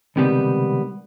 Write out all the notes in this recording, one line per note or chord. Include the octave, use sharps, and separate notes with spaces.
C#2 C3 D#3 G3 B3